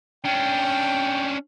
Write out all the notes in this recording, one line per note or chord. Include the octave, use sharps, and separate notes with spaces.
C#4 D4 G5